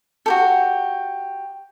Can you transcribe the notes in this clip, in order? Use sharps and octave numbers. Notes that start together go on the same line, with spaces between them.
F#4 G4 A4